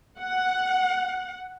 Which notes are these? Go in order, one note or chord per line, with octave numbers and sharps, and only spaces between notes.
F#5